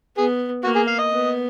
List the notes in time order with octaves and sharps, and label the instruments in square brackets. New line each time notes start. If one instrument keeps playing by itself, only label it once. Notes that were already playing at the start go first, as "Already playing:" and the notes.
[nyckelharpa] B3 [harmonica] G#4
[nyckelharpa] A#3 [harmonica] F#4
[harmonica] G#4
F5
D#5
[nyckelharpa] B3